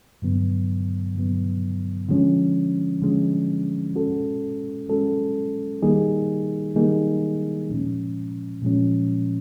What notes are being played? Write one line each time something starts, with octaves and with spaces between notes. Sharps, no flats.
G2 D3 F#3 B3
G2 D3 F#3 B3
D3 F3 G#3 C#4
D3 F3 G#3 C#4
G#3 C#4 F#4 A4
G#3 C#4 F#4 A4
D#3 G3 A#3 D#4 G#4
D#3 G3 A#3 D#4 G#4
A#2 F3 G#3 C#4
A#2 F3 G#3 C#4